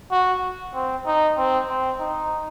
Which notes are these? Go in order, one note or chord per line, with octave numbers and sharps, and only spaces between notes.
F#4
C4
D#4
C4
C4
D#4